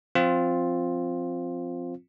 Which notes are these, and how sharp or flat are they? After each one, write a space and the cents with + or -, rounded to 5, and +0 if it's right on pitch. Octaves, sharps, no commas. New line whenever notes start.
F3 +0 C4 +0 F4 +5